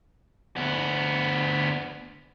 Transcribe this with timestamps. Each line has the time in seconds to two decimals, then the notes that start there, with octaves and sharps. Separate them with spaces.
0.56 D2 B3